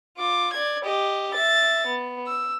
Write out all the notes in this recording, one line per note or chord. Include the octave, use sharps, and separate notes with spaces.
F4 D6
D5 G#6
G4 D#5
E5 A6
B3
E6